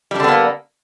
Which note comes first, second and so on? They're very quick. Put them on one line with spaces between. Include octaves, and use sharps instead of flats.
G3 D4 D3 B3 A#3